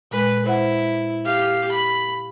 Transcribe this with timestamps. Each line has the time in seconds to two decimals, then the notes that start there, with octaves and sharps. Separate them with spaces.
0.11 A#2 G#3 B4
0.46 E4 C5 F#5
1.25 G4 F5
1.72 B5